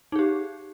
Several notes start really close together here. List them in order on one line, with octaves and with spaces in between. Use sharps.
D#4 G#4 G4